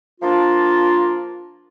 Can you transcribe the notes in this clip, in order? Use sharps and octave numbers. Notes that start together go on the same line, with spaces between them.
F3 A#3 D4 F4